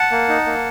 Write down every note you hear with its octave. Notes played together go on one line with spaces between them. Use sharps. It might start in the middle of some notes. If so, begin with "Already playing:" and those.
Already playing: F#5 A5
A#3
D#4
A#3